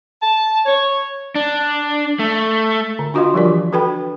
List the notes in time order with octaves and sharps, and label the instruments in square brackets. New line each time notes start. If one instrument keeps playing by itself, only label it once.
[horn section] A5
C#5
[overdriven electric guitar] D4
A3
[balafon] D3
D4 F4 F#4 D#5 F5 C6
F3 G3 F4 G4 A#4 D5
E3
D4 F#4 A4 B4 G5 B5